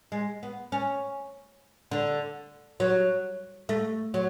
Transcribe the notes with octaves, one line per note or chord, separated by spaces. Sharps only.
G#3
B3
C#4
D3
F#3
A3
F#3